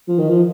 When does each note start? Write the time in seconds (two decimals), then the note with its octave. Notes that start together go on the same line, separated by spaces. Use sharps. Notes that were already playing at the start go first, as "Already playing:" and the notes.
0.08 F3
0.18 D#3
0.29 F3